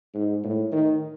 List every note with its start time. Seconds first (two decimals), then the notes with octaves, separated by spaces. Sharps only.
0.14 G#2
0.44 A2
0.72 D#3